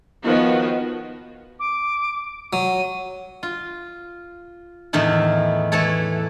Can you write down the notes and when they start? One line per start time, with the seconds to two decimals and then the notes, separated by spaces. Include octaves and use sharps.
0.24 D#3 F3 B3 F#4
1.59 D6
2.53 F#3 D#7
3.43 F4
4.93 E2 A2 D#3 A3 E4
5.72 E3 A3 A4 C#5